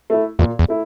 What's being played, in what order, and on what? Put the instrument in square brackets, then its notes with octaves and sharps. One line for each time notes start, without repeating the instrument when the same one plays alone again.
[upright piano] A3 E4
[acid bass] E2 [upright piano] A#2
[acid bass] E2
[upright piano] A3 E4